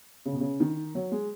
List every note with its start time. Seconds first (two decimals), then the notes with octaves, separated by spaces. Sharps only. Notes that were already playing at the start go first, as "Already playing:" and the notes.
0.26 C#3
0.33 B2
0.40 C#3
0.60 D#3
0.95 F#3
1.12 G#3